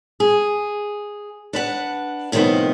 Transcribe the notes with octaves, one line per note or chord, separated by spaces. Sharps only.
G#4
D4 B4 F#5
A2 C3 D#3 F3 G3 B3